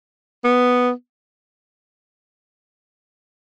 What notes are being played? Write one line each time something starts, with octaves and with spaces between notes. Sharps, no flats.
B3